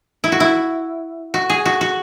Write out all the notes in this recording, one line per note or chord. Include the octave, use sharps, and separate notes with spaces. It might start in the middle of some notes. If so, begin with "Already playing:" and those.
E4
F#4
E4
F#4
G#4
F#4
F#4